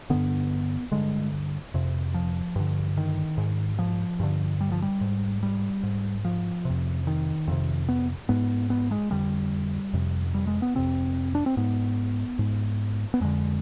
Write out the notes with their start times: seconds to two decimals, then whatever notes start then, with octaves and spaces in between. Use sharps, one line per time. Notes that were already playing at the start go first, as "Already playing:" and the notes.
0.10 G2 D3 B3
0.92 G2 D3 G#3
1.74 F2 C3
2.14 F3
2.56 G2 D3
2.97 D#3
3.38 G#2
3.79 F3
4.20 G2 D3
4.61 G3
4.71 F3
4.82 G3
5.01 G#2
5.43 G3
5.83 G#2
6.25 F3
6.65 F2 C3
7.07 D#3
7.48 F2 C3
7.89 B3
8.29 G#2 B3
8.70 B3
8.91 G#3
9.11 F2 D3 G3
9.94 F2 C3
10.34 G3
10.47 G#3
10.62 B3
10.75 F2 C3 C4
11.35 D4
11.46 C4
11.57 G#2 B3
12.39 G#2
13.14 B3
13.21 F2 D3 G#3